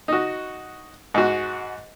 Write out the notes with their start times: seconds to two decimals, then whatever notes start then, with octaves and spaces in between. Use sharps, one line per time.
0.08 D#4 F#4
1.14 G#2 F#4